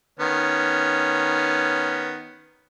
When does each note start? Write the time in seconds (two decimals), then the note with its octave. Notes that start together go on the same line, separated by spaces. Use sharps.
0.19 D#3 B3 C#4